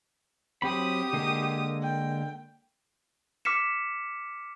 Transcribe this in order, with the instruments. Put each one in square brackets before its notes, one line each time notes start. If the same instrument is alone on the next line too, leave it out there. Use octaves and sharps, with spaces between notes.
[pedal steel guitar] F#3 C4 B5 [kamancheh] G4 D#6
[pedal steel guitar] D3 G#3 A#3
[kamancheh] G5
[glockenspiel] D6 F6 B6 C#7 E7